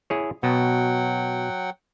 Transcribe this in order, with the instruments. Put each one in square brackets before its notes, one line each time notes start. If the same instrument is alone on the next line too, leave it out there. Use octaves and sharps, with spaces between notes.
[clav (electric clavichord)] E4 G#4 C#5
[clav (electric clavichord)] B2 [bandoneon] F#3 F#5 G5